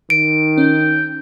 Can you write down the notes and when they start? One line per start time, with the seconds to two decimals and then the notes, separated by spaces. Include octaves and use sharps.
0.10 D#3 D7
0.58 C#4 G5